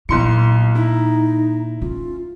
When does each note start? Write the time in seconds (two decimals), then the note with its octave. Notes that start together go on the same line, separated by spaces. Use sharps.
0.09 B1 A#2 E4 C6 C#7
0.75 D#4 E4
1.82 C#4 F4